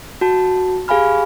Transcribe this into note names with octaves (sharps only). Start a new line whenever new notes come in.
F#4 A5
G4 G#4 F5 G#5 B5 F6